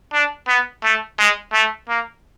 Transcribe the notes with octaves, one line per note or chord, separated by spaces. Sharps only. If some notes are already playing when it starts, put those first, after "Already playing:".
D4
B3
A3
G#3
A3
A#3